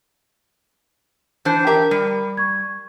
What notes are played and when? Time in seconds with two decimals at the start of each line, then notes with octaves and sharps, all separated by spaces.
1.45 E3 D4 C5
1.67 G4 A#4 E5 A#5
1.91 G3
2.37 C#6 G#6